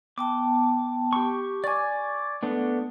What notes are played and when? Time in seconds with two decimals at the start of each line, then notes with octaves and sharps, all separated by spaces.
0.18 B3 G5 A5 D6
1.13 G4 C#6
1.64 D5 G#5 C#6 D6
2.43 A3 B3 D4